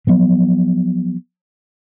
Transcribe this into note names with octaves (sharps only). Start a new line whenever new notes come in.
F3 F#3 B3